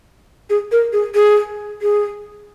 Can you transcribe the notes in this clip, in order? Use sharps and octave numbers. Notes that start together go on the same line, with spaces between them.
G#4
A#4
G#4
G#4
G#4